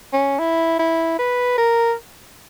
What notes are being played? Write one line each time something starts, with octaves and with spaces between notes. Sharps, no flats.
C#4
E4
E4
B4
A#4